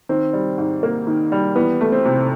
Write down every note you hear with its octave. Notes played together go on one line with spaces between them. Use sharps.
D#3 C4
G3
G#2
A#3
D#3
G3
E3 B3
A3
C4
C3